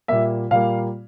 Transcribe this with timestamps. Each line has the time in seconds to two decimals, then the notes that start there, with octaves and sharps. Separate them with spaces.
0.08 A#2 G3 A#3 E5
0.51 A#2 G3 A#3 F5